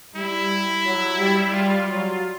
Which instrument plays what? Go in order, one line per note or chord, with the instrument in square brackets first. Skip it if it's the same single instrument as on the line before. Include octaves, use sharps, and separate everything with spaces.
[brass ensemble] G3 [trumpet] E4
[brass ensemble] F#3
G3
[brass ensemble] G3 [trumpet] F4
[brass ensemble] F#3